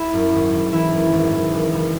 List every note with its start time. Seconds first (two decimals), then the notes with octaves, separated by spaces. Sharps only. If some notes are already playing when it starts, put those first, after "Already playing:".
Already playing: E4
0.13 F#2
0.33 G#1
0.53 G#1
0.72 E3 E4
0.92 F#2
1.12 G#1
1.32 E3
1.53 F#1
1.72 F#1